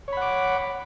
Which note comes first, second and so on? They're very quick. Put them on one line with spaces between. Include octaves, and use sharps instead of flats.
C#5 B5 F#5 D6